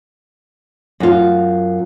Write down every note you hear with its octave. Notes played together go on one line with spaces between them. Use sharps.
F#2 F4